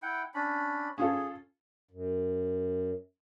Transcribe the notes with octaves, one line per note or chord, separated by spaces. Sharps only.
E4 F#5 G5
C#4 D4 B5
C#4 F4 G#4 A4
F#2